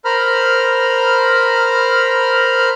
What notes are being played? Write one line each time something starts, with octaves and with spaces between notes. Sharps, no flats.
A#4 C5 A#5 B5 F6